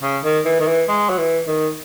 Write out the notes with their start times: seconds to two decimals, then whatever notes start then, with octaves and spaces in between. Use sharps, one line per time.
0.02 C#3
0.24 D#3
0.45 E3
0.60 D#3
0.67 E3
0.88 G#3
1.09 F#3
1.18 E3
1.47 D#3